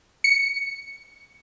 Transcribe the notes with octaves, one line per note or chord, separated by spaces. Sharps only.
C#7